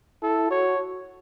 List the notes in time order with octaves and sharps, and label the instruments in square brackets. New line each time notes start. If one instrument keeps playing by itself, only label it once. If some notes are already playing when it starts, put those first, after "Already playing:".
[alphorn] E4 [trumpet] A4
[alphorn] F#4 [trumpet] C#5